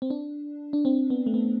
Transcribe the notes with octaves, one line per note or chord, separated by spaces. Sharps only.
C4
D4
D4
C4
B3
A3
B3